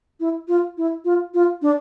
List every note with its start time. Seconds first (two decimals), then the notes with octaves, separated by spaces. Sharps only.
0.20 E4
0.48 F4
0.78 E4
1.05 F4
1.34 F4
1.62 D4